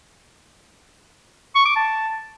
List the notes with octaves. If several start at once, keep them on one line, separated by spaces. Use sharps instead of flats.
C#6
D6
A5